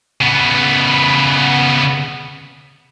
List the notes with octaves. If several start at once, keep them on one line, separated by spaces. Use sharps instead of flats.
C#3 B3